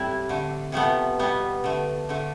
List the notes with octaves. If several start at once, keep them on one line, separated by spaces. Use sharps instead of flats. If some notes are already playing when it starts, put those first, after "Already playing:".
Already playing: A2 G3 C4 E4
D3 A3
C3 F3 A3 B3
B2 G3 B3
D3 A3
D3 A3